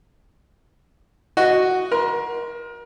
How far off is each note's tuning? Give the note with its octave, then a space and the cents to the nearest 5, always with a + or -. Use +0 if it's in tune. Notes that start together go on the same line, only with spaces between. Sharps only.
F#4 +0 D#5 +0
A#4 +30 C6 -15